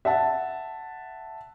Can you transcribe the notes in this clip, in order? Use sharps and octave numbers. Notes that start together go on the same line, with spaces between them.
E5 F#5 A5